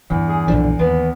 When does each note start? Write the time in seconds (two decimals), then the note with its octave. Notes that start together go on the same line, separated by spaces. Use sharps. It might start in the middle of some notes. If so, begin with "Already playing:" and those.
0.10 E2 G2 G3
0.28 G#4
0.48 B1 A#2 D3 F3
0.79 D#2 B3